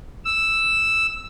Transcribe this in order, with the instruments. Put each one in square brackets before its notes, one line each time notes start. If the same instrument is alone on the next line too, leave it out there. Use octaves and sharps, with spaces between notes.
[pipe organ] E6